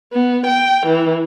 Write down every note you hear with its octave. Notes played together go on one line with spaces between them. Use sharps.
B3
G5
E3